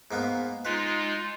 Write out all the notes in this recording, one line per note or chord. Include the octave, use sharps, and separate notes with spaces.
G#2 A#3 B3
G#3 D#4 F4 B4